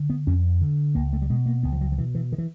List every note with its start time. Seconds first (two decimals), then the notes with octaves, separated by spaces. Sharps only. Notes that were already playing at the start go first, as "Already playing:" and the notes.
Already playing: D3
0.10 B3
0.27 F2 C#4
0.61 D3
0.95 C#2 A#3
1.13 A3
1.22 G3
1.30 B2 G#3
1.46 A#3
1.63 C#2 B3
1.72 F3
1.81 F#3
1.92 F3
1.98 B2 E3
2.15 E3
2.32 D#3
2.38 E3